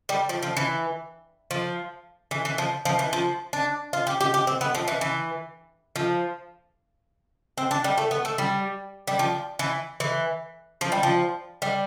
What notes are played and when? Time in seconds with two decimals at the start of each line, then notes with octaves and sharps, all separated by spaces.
0.09 G3
0.29 F3
0.43 F3
0.57 E3
1.51 F3
2.31 E3
2.45 E3
2.58 F3
2.85 F3
2.99 E3
3.13 F3
3.53 D4
3.93 F4
4.07 G4
4.21 G4
4.34 G4
4.47 C4
4.61 B3
4.75 F3
4.88 E3
5.01 E3
5.96 F3
7.58 C4
7.71 D4
7.84 G3
7.98 A3
8.11 B3
8.25 A3
8.38 G3
9.07 G3
9.19 F3
9.59 E3
10.00 E3
10.81 F3
10.92 G3
11.03 F3
11.62 G3